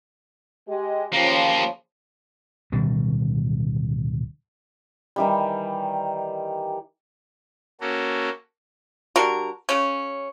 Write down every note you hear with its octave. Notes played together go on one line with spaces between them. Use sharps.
G#3 G4
C#3 F3 A#3 G4
D1 B2 D#3 G3
D#3 E3 G3
A#3 C#4 F#4 A4
D3 G3 F#4 A#4
C#3 C#4